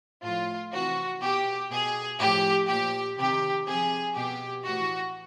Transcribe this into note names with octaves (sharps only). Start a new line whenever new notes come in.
A2 F3 F4
C3 E3 F#4
B2 G4
B2 G#4
A2 F3 G4
A#2 F3 G4
C3 D#3 G4
C3 F3 G#4
B2 G4
A2 E3 F#4